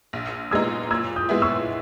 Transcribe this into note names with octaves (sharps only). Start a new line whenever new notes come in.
A#1
A#2 G#3 B3 D#4 E6 G#6
A#2 E6 G#6
D#6 G6
G#3 B3 E4
C#6 E6